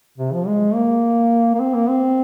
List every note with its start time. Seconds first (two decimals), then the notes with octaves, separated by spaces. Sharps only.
0.18 C3
0.33 F3
0.47 G#3
0.75 A#3
1.54 A#3
1.60 C4
1.74 A#3
1.89 C4